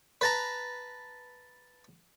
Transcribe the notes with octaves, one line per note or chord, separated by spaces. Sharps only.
B4 A5 A#5